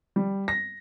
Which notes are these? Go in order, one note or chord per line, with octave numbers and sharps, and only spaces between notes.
G3
A#6